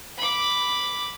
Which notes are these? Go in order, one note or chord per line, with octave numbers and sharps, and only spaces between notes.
B5 D6